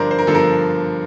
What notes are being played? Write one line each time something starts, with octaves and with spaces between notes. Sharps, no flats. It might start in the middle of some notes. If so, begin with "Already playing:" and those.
Already playing: G2 D3 F3 A#4 C5 D5
C5
A#4
G2 D3 F3 A4
A#4